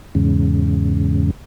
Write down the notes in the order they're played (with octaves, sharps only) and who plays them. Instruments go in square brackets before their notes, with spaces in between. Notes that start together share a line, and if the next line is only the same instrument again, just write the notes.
[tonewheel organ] E2 G#2 C#3